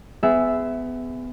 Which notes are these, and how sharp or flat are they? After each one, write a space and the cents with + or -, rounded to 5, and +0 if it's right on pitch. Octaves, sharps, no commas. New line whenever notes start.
B3 +25 G#4 +0 E5 +0